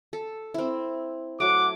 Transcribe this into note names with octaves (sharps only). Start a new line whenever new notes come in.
A4
C4 E4
F#3 A3 F#5 D6